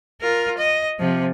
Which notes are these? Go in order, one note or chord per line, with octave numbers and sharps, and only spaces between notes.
F4 A#4
D#5
C3 F3